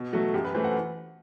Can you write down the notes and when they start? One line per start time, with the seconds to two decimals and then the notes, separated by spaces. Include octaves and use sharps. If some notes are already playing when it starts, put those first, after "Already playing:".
Already playing: B2
0.13 F#3 A3 F#4
0.34 F#2 G4
0.45 B4
0.54 E3 A3 C5
0.64 F#5